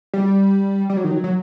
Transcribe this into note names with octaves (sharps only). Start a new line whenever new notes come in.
G3
G3
F#3
D#3
F#3
F#3